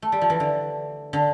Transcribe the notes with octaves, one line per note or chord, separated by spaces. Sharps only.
A3
G3
F3
E3
D3
D3